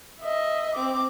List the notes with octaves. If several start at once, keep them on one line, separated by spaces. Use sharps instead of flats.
D#5 E5
C4 D6